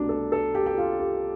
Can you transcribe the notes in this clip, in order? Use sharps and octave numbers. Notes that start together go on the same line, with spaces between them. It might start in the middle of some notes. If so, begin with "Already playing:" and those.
Already playing: C2 B2 A3 D4
A4
A4
G4
G4
F4
G4